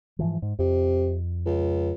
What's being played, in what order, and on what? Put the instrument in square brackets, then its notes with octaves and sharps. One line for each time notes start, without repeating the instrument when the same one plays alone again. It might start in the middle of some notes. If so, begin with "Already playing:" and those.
[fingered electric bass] G#2 E3 F3
G#2
[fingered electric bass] F2 [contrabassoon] C3
[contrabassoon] C#2